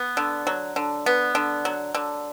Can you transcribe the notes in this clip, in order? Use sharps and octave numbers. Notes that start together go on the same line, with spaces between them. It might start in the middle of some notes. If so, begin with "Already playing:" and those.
Already playing: B3
D3
F#3
D3
B3
D3
F#3
D3